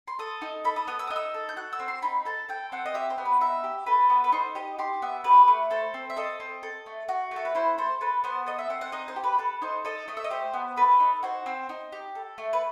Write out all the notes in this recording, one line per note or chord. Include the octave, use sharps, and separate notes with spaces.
C6
A4 D#6
D#4
A4 B5
D#6
B3 D#6
E6
D#6
D#4
E6
A4
G6
F#4 F#6
E6
C4
C6
D#4 B5
A4 A5
A4 G5
C4 F#5
D#5
G4 E5
C5
B3
B4
D#4 E5
G4
A4 B4
B3
B4
D#4 C5
G4 D#5
G4 C6
B3 E5
G4 B4
A3
A4 C5
C4
E5
A4 D#5
C4
A4
A3
F#4
A3 A4
B4
E4 C5
A4 C5
A4 B4
B3 C5
A4 D#5
E5
C4 F#5
F#5
D#4 D#5
C5
G4
B4
A4 B4
D#4 C5
A4 D#5
A3 D#5
E5
D#5
G4 C5
B3
A4 B4
D#4
F#4 C5
C4
D#4
G4
A4
A3
B4